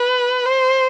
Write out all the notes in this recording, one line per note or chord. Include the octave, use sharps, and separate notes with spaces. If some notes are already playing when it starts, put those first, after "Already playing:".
Already playing: B4
C5